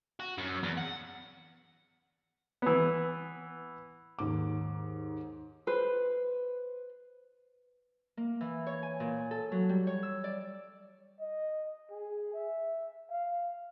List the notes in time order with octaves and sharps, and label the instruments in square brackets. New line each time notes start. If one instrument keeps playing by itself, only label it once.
[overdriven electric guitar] F#4
F#2
E2
F#5
[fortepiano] E3 B3
[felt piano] D#2 G#2 D6
[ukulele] B4 C5
[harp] A#3
E3
C#5
G#5
A#2
A4
F#3
G3
C#5
E6
D5
[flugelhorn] D#5
G#4
E5
F5